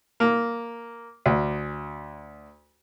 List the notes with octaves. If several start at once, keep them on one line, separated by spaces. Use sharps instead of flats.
A#3
D2